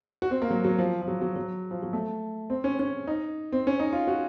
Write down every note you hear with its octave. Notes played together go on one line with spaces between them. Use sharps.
F#4
C4
A#3
F#3
F#3
F3
F3
F#3
F#3
F#3
F3
F#3
A3
C4
C#4
C#4
D#4
C4
C#4
D#4
F4
F#4